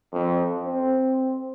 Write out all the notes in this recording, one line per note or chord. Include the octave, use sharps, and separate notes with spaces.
F2
C4